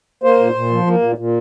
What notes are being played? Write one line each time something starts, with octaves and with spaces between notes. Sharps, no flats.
A#3 C5
A#2
A#2
F3
A#3
A#2
A#2